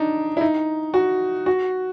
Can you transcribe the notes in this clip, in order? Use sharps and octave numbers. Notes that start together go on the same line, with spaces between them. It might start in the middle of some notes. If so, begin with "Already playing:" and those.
Already playing: D4 D#4
E4
D#4
F#4
F#4